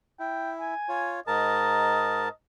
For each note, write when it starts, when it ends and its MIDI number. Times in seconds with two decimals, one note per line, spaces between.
0.20 0.74 64
0.20 0.51 79
0.60 1.17 80
0.89 1.20 65
0.89 1.20 73
1.27 2.29 44
1.27 2.29 70
1.27 2.30 75
1.27 2.29 81